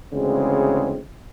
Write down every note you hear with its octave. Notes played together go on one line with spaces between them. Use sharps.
D2 C#3 E3 G#3 C4